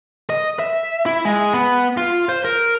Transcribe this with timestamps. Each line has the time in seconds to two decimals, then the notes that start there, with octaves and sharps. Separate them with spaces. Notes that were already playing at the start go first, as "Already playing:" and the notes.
0.30 D#5
0.59 E5
1.06 E4
1.25 G#3
1.53 B3
1.97 F4
2.29 C5
2.45 A#4